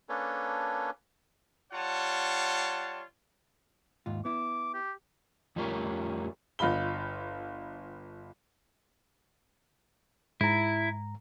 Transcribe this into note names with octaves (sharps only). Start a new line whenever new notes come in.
A#3 C#4 D4 A4 B4 C#5
G3 F4 C#5 F#5 A5
D#2 G#2 F4
B3 E4 D6
G4
F2 F3 G3 A3 C#4 A#4
G1 F4 D#5 B5 G7
G#2 E4 A#5